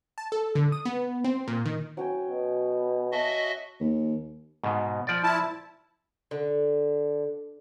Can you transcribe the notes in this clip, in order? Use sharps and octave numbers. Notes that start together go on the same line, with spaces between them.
A5
A4
D3
D#6
B3
C4
A#2
D#3
F#3 C#4 G5
B2
F#4 D#5 E5 A5
D#2
G#2 B2
F3 D5
E4 A5
D3